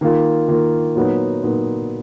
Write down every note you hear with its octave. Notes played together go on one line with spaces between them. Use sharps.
D#3 A#3 F4
D#3 A#3 F4
A#2 F#3 B3 D#4
A#2 F#3 B3 D#4